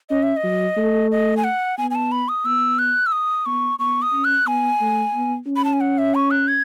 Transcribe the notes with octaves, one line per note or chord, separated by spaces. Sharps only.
C#4 D#5
E5
D#5
F#3
A3
D#5
G#5
F#5
B3 G#5
G#5
A5
B5
D#6
B3 E6
F#6
E6
D#6
B3 C#6
B3 C#6
D#6
C#4
F#6
B3 G#5
A3
B3
C#4
B5
A5
G#5
F#5
E5
C#6
F#6
G#6